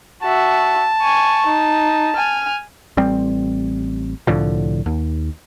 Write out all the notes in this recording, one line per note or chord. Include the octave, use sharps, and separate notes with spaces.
F#4 E5 A5
G#5 C#6
D#4
G#5 F6
A1 G3 C4
C2 A2 D3 F3
D#2